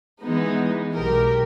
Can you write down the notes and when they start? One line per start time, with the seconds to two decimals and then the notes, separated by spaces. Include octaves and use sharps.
0.22 E3 G#3 B3 D#4
0.94 B1 G4 A#4